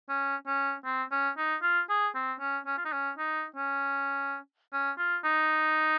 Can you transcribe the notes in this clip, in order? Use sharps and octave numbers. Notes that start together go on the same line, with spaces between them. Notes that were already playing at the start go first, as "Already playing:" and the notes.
C#4
C#4
C4
C#4
D#4
F4
G#4
C4
C#4
C#4
F4
D#4
C#4
D#4
C#4
C#4
F4
D#4